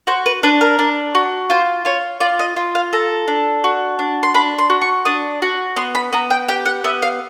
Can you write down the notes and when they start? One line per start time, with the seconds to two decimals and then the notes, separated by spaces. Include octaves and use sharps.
0.07 F#4 C5
0.26 B4
0.43 D4 B4
0.61 A#4
0.79 D4
1.15 F#4
1.50 F4 C5
1.85 F4 C#5
2.20 F4 D5
2.39 D#5
2.56 F4
2.75 F5
2.93 A4 A#5
3.28 D4
3.64 F#4
3.99 D4
4.23 C6
4.34 D4 B5
4.58 C6
4.70 F#4
4.82 C#6
5.05 D4 D#6
5.42 F#4
5.76 B3 C6
5.95 B5
6.13 B3 A#5
6.30 G5
6.48 G4 G5
6.65 F#5
6.84 B3 E5
7.02 F5